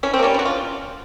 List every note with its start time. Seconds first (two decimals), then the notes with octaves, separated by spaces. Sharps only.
0.03 E3 C#4
0.14 C4
0.19 G3 A#3 C#4
0.34 E3 F#4
0.45 F4